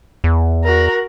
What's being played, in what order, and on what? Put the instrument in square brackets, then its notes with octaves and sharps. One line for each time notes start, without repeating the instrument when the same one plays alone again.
[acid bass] E2
[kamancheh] F#4 A#4